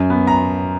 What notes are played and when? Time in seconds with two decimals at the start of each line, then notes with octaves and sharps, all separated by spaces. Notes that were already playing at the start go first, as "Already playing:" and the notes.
Already playing: F#2
0.10 B3
0.27 A#5